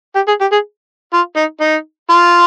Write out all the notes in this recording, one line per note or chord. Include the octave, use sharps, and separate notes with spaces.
G4
G#4
G4
G#4
F4
D#4
D#4
F4